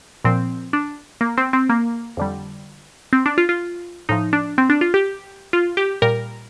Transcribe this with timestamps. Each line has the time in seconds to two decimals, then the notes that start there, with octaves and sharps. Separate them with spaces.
0.25 A#2 F3 C4
0.73 D4
1.21 A#3
1.38 C4
1.53 C4
1.69 A#3
2.17 F2 D3 G3
3.13 C4
3.26 D4
3.38 F4
3.49 F4
4.09 A2 F3 D#4
4.33 D4
4.58 C4
4.70 D4
4.81 F4
4.94 G4
5.53 F4
5.77 G4
6.02 A#2 G3 A#4